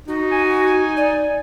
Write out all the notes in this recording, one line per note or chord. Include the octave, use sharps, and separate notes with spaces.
D#4 F#4
G#5
D5